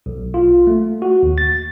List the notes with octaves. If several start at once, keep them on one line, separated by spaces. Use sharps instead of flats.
B1
F4
A3
F#4
D#2
A6